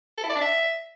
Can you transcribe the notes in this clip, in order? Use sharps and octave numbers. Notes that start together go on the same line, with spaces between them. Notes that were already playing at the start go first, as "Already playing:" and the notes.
A4
E4
D5
D4
E5